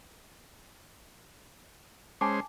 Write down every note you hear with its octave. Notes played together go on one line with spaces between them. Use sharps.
G#3 C#4 C5 G#5 A5 D6